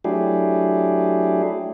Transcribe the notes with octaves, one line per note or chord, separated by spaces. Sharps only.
F#3 A3 D4 E4 G4 G#4